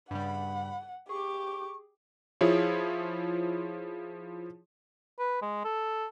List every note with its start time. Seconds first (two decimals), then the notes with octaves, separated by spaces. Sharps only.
0.11 G2 C#3 G3 F#5 B5
1.09 G4 G#4 C#6 D6
2.41 F3 E4 F4 G#4 C#5
5.19 B4
5.42 G#3
5.64 A4